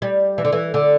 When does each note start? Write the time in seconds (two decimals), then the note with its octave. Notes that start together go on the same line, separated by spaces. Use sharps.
0.02 G3
0.38 E3
0.45 D3
0.52 E3
0.74 D3